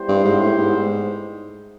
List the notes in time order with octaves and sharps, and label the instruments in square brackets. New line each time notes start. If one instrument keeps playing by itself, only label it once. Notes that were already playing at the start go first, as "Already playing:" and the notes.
Already playing: [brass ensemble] G3 B3 E4 G4 C5
[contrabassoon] G2
G#2
A2
G#2